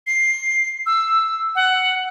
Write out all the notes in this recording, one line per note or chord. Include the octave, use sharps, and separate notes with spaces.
C7
E6
F#5